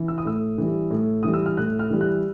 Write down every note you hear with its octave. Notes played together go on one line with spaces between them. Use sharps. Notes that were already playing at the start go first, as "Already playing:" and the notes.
Already playing: E3
E6
D#6
A2 E6
E3 G3
A2
E3 G3 D#6
E6
F6
A2 F#6
F6
E3 G3
F#6